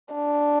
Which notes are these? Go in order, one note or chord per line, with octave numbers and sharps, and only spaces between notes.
D4